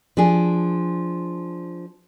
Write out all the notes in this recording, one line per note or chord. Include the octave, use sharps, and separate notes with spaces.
F3 D4 G#4